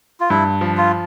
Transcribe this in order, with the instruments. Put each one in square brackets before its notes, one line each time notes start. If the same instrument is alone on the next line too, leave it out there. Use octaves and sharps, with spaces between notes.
[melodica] F4
[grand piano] G2 [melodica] E4
[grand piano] F3
[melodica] F4